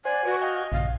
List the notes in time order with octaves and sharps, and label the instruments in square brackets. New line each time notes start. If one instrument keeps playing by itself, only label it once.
[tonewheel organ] C5 F#5 [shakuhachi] D5 [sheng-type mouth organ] G#5
[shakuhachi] F#4 [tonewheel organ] B4 D5 C#6
[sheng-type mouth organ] D#5 [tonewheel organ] F5 G5 G#5
[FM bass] A#1 [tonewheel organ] G2 C#3 [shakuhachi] F5